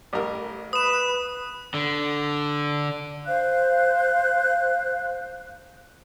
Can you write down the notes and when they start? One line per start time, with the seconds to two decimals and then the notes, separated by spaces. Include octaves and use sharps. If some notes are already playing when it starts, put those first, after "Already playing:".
0.13 A1 G3 A#4
0.73 B4 D#6 E7
1.74 D3
3.26 C5 F5 F#6